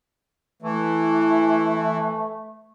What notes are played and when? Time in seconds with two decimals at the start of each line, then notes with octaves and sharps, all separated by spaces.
0.62 E3 A3